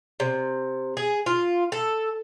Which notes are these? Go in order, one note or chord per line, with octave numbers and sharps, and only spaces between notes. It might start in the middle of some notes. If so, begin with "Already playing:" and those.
C3
G#4
F4
A4